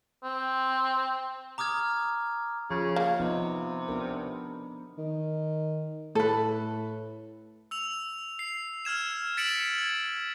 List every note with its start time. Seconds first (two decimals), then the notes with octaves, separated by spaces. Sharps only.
0.24 C4
1.58 A#5 D6 D#6 F6 G#6
2.71 C#3 F3
2.96 A#3
3.19 C3 F3 B3 D#4
3.88 B3 D4 A#4
4.98 D#3
6.15 A2 A4 B4
7.71 E6 F7
8.39 C7
8.85 E6 F6 G#6 E7
9.37 A6 B6 C#7 D7 E7 F#7
9.78 G#6